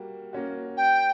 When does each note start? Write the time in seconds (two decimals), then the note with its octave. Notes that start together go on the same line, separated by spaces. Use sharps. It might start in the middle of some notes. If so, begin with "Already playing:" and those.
Already playing: G3 A#3 F#4
0.33 A#3 C#4 F#4
0.77 G5